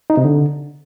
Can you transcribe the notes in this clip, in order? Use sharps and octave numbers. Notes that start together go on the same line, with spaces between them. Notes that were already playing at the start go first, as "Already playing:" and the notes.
D#4
C3
D3